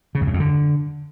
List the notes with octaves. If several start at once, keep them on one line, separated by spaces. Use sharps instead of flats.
C#3
F2
F#2
F2
D3